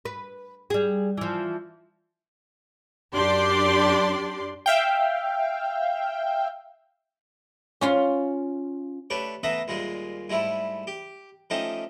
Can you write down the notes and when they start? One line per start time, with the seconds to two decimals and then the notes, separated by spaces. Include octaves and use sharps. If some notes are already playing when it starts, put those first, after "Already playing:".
0.05 B4
0.70 G3 G#4
1.17 E3 F3
3.14 F#2 D4 G4 D5 C6
4.66 E5 F5 G5
7.81 C#4 F4 C6
9.10 A3 D4 G4 B4 C#5
9.43 B2 A3 B4 E5 A#5 D#6
9.68 D#2 A#2 G3 G#3
10.30 G#2 G3 A3 E4
10.87 G4
11.50 F3 A3 C#4 D#4 G4